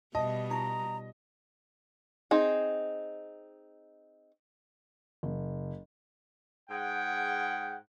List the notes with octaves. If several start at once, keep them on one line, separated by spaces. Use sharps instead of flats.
B2 G3 D#5 E5 A5
D#4 F4 A#5 C#6
C4 D#4 G#4
F#1
G#2 G#4 F#5 G5